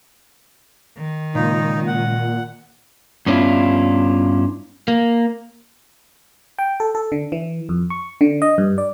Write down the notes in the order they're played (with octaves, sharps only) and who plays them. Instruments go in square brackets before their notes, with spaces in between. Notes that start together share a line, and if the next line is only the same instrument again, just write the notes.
[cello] D#3
[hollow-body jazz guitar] C#2 [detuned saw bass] A#2 [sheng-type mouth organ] D#4
[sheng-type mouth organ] F#5
[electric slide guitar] G2 B3 C#4 D4 E4 F4
A#3
[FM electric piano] G5
A4
A4
D3
E3
F2
C#6
D3
D#5
G2
D5